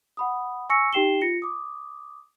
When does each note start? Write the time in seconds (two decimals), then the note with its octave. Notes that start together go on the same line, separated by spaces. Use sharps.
0.17 F#5 B5 D#6
0.69 G#5 C#6 E6 A#6 C#7
0.93 D#4 G4 G5 C7 E7 G7
1.21 F4 A#6 C#7
1.42 D6 D#6